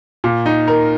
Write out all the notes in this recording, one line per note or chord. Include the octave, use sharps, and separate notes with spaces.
A#2
D#4
A#4